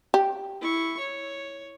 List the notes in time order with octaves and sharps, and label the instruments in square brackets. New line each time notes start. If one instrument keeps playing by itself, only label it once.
[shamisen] G4
[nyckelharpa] E4 C#6
C#5